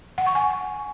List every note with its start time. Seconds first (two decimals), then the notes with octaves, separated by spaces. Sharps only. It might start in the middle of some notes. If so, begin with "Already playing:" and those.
0.18 F#5
0.27 C#6
0.35 G#5